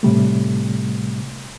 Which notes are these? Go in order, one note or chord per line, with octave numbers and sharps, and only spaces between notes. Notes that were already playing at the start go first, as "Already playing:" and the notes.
A2 C3 G3 A3